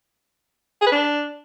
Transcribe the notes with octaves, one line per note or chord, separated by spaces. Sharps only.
G#4
B4
D4